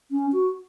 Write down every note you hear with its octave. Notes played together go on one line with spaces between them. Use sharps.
C#4
F#4